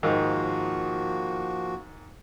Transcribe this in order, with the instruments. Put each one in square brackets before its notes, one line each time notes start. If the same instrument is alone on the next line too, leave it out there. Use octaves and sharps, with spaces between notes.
[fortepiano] G#2 D#3 F5 [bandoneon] F3 A#3 F#4